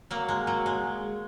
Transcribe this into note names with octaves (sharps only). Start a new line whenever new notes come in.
F#3 A#3
G#3
F#3
G#3